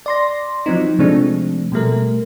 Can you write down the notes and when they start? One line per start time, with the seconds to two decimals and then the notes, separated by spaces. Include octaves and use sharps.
0.06 D5 C6 A#6
0.66 F3 F#3 C4 D#4
0.99 C3 F3 G#3 A3 C4 D4
1.72 B2 G3 A3 A#4